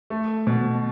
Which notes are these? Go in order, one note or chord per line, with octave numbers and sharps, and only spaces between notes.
A3
B2